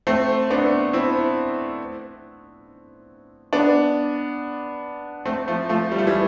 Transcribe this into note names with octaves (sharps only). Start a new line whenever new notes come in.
A3 C4
B3 D4
C4 E4
B3 D4
A3 C4
F3 A3
F3 A3
G3
A3
E3 G3